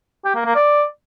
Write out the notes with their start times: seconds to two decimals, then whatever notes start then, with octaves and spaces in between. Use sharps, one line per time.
0.24 G4
0.35 A#3
0.45 A#3
0.55 D5